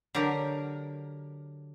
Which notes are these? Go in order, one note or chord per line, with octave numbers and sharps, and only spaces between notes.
D3 F#3 G4 A#4